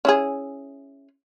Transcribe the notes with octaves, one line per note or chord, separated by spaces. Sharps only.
C#4 E4 G#4